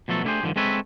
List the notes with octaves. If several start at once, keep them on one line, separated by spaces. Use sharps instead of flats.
B2 F3 F#3 A3 A4
A3 D4 E4 G4 G#4 C5
G2 B2 D3 D#3 F3
G#3 C4 A4 B4 C#5 E5